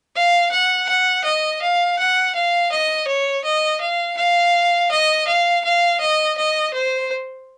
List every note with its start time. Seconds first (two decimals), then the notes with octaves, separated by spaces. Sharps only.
0.16 F5
0.52 F#5
0.89 F#5
1.24 D#5
1.62 F5
1.99 F#5
2.35 F5
2.72 D#5
3.08 C#5
3.44 D#5
3.81 F5
4.17 F5
4.91 D#5
5.27 F5
5.64 F5
6.00 D#5
6.38 D#5
6.73 C5